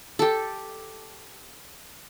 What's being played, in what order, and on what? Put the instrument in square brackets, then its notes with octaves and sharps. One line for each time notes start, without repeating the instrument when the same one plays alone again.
[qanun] G4 A4